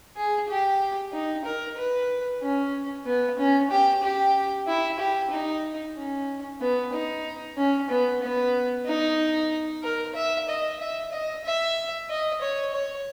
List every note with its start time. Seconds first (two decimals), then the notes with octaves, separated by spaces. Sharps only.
0.16 G#4
0.49 G4
1.13 D#4
1.44 A#4
1.78 B4
2.42 C#4
3.06 B3
3.39 C#4
3.70 G4
4.03 G4
4.68 E4
4.99 G4
5.31 D#4
5.97 C#4
6.61 B3
6.93 D#4
7.57 C#4
7.90 B3
8.22 B3
8.86 D#4
9.83 A#4
10.15 E5
10.48 D#5
10.80 E5
11.12 D#5
11.45 E5
12.10 D#5
12.42 C#5
12.74 C#5